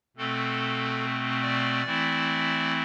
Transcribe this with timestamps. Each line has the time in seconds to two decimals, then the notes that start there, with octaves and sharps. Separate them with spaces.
0.17 B2 A3 C4 A4
1.42 D5
1.84 E3 A3 C4 E4